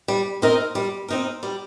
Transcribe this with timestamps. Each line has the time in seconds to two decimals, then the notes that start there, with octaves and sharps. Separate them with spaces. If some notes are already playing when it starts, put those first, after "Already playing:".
0.08 G3
0.42 C4 D#4 A#4
0.75 G3
1.08 C4 D#4 A#4
1.43 G3